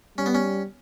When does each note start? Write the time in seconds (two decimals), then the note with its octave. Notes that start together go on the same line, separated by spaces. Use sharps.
0.18 G3 C#4
0.26 B3
0.35 C#4